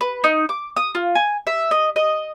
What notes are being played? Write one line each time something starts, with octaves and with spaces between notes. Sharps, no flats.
B4
D#4
D6
D#6
F4
G#5
E5
D#5
D#5